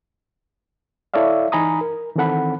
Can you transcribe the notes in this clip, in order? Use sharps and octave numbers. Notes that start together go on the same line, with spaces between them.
E4 A4 C#5 D5 E5 F5
E3 D#4 G#5 A#5 B5 D#6
A#4
D#3 E3 C4 A4 F#5 B5